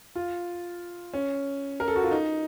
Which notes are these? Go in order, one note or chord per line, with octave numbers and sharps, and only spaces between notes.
F4
C#4
A#4
A4
F#4
F4
D#4